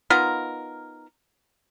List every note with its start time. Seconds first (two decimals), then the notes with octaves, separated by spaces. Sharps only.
0.10 B3 D#4 F4 A#4